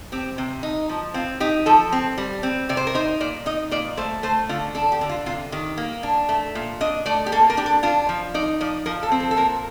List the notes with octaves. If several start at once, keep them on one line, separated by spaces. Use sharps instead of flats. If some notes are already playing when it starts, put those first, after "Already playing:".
C4 G4
C3
D#4
F3
C4 F4
D#4 G4
F3 A4
C4
G3
C4
C3 D5
C5
A#4
D#4 C5
A#2 D5
D#4 D#5
A#2 D5
A3 C5
A3 C5
D3 F4
D4 A4
G4
D3
F4
C3 F4
D#3 G4
A#3
D4
A3
A#2
D4 D#5
A3 D5
G4
A#3 A4
A#4
D4 G4
A4
D4 F4
F3
D#4 D5
F3 D5
F3 A#4
A4
C4
A4
A4
A#2 A#4